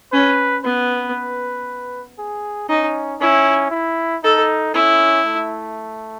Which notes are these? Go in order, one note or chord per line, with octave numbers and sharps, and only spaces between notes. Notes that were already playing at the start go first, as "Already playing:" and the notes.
C#4 B4
B3 B4
G#4
C#4 D#4
C#4 E4
E4
D#4 A4
C#4 E4
A3